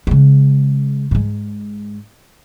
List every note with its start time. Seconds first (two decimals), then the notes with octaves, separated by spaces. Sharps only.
0.07 C#3 G#3
1.11 G#2 G#3